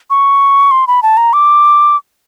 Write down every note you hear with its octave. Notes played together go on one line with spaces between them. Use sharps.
C#6
C6
B5
A5
A#5
D6